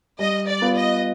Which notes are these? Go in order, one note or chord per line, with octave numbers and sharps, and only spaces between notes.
G3 D#5
D5
B3 F4 B4
D#5